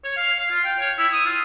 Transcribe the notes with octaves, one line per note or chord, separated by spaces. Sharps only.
C#5
F5
F5
F4
G5
C#5
E4
D#6
F4